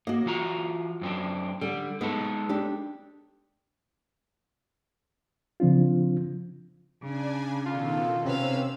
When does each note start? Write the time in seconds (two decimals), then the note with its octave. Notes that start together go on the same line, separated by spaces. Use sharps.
0.07 A#3 F#4 D#5
0.26 E3 F4 A#5
1.01 F#2 C4 D4
1.61 D3 G3
2.01 G#3 B3 D#4 A4
2.49 D4 G4
5.60 C#3 F3 C4 D4 F4
7.02 C#3 D4 G#5
7.66 B2 D#3 F4 A4
8.26 C3 C4 C#4 B4 F5 E6